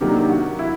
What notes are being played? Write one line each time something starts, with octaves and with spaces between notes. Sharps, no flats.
C3 D#3 F#3 A#3 D4 G4
F#4
E4